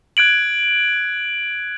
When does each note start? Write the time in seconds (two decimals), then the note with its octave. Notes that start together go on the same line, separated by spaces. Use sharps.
0.17 F#6 G#6 D7 F#7